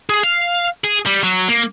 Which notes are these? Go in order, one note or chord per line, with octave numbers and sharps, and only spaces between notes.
G#4
F5
G#4
G3
F#3
A#3